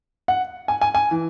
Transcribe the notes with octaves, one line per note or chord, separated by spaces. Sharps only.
F#5
G#5
G#5
G#5
E3